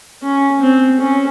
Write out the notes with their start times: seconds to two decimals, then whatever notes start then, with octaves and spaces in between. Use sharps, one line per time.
0.23 C#4
0.61 C4
1.00 C#4